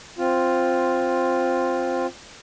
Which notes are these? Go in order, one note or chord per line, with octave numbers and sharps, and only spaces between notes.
C4 F4